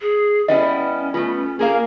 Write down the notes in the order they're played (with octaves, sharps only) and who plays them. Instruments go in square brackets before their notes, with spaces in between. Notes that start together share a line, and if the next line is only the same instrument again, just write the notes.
[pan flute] G#4
[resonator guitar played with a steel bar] G3 B3 E4 [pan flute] C#4 [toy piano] D#5
[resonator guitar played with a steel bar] A3 B3 [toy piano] F4
[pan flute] A#3 [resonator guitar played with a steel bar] G#4 A#4 F5